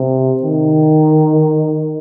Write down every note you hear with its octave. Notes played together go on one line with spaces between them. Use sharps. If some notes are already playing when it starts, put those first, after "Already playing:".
Already playing: C3
D#3